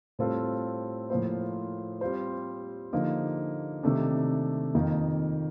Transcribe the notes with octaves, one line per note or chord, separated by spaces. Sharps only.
A2 G3 C4 F4 A4
A2 F3 A#3 F4 C5
G3 C4 F4 C5
D3 F3 A#3 D#4 G4
C3 D#3 A3 D4
F2 D#3 A#3